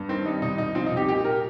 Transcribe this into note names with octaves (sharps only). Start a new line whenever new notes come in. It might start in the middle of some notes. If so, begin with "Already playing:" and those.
Already playing: G2
D#3 C4
G3 D#4
C3 D#4
C2 D#4
F3 C4
D#4
C2
G4
A#2 G4
A#4